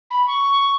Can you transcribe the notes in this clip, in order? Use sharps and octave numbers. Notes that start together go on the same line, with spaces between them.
B5
C#6